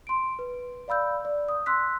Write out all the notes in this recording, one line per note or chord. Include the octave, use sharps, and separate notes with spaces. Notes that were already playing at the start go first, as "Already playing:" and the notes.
C6 D7
B4
D5 F5 B5 E6 G6
D5
D#6
C6 E6 F#6 B6